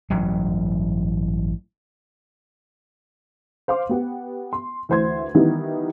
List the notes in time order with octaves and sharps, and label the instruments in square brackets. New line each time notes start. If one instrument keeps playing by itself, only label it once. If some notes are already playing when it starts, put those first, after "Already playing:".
[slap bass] A1 G2 F#3
[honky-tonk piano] C5 F5 C6 D6
B3 G4 F#5
C6
D2 E3 C5 C6 G#6
D#3 E3 G3 B3 D#4 E4